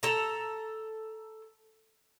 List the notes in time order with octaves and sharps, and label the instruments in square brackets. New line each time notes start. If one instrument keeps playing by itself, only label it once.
[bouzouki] A4 A#5